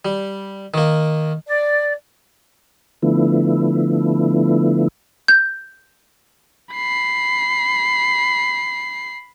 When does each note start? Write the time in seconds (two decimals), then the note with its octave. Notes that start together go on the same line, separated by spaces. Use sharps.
0.05 G3
0.74 D#3 A#3
1.47 D5
3.02 D3 F3 A3 B3 E4
5.28 G6
6.74 B5 C7